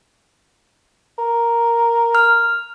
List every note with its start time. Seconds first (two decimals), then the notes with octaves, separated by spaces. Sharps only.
1.18 A#4
2.15 F6